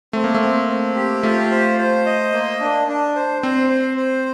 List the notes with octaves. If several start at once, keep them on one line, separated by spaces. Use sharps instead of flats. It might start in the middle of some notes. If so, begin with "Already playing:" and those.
A3 C4
A#3
A3
C4
C4
G4
A3 F4
C5
C5
D#5
A#3
D4
D4
C5
C4 C5
C5
C5